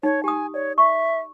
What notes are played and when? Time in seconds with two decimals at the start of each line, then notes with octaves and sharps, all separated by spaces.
0.03 D#4 C#5
0.24 G4 G#5 D#6
0.54 C#5 D5
0.78 E5 C#6